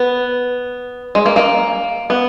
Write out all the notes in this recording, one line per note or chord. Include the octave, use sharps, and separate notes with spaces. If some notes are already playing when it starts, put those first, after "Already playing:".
Already playing: B3
G#3
A#3
A#3
B3